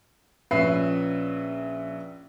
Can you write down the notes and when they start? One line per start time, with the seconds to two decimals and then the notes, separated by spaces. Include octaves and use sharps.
0.51 A#1 C#4 B4 E5 C7